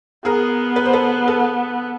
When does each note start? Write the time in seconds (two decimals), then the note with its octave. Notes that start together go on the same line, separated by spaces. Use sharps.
0.25 B3 G#4 A#4
0.76 B4
0.85 C5
0.93 A4 B4
1.27 A4 B4